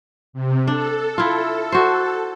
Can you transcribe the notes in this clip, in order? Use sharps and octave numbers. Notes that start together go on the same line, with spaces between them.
C3
D4 A4
E4 F4
F#4 C5